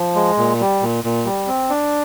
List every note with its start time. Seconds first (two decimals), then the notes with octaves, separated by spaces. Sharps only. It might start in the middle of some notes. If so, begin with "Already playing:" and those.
Already playing: F3
0.15 G#3
0.38 A#2
0.60 G3
0.82 A#2
1.04 A#2
1.25 G3
1.47 C4
1.70 D4